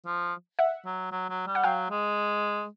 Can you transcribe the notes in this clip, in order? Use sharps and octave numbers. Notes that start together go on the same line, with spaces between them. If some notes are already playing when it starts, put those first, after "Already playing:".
F3
E5 F#5
F#3
F#3
F#3
G3
F#5
F#3 F5 G5
G#3